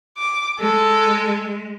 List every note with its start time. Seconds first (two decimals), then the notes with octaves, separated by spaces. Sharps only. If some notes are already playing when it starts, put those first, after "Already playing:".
0.17 D6
0.59 G#3 A4